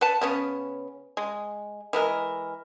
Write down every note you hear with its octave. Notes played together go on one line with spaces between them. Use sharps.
B4 F#5 A5
C#3 B3 C#4
G#3
E3 G#3 A#4